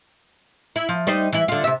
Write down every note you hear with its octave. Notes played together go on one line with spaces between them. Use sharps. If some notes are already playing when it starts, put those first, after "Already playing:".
E4
F3
G3 D#4 C5
E3 E4
D3 F4
C3 E5